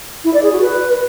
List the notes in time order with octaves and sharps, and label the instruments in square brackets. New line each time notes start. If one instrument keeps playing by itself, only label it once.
[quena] E4
D5
G#4
F#4
B4